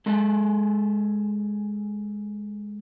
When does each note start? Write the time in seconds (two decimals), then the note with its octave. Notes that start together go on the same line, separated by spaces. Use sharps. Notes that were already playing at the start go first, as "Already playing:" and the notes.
0.06 G#3 G#4 A4